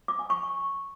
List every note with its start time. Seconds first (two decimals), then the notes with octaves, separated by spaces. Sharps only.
0.08 D6
0.19 G#5
0.30 C#6